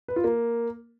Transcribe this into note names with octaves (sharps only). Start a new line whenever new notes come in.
B4
F4
A#3